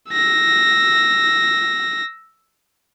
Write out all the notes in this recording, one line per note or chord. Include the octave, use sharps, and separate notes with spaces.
E6 A#6